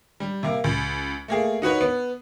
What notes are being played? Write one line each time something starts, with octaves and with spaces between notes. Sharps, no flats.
G3
C3 A#3
C#2
A3 A#3 G#4
D#4 F#4 B4 C#5
B3